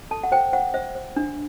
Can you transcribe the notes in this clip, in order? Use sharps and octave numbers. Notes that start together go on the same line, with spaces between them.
A4 A5
F#5
C5 G5
C5 F#5
C5 E5
C5
D4